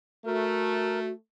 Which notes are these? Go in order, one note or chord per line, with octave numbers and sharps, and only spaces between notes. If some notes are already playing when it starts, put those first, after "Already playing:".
A3 F#4 A#4